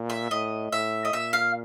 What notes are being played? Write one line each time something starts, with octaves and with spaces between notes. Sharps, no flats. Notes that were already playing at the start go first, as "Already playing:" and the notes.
Already playing: A#2
E5
A2 D#5
A2 E5
D#5
A#2 E5
F5